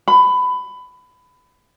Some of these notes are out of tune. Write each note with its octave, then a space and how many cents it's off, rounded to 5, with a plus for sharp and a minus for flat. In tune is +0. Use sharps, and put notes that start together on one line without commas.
B5 +20